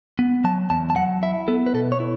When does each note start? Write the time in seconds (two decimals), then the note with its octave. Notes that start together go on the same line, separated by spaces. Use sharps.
0.19 B3
0.44 F#3 A5
0.70 E2 A5
0.90 A5
0.96 F#3 F#5
1.23 E4 E5
1.48 B3 A4
1.66 B4
1.74 B2 A4
1.92 C#5
2.00 E4